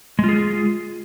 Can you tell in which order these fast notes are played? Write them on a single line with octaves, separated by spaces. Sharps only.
G#3 F4 G#4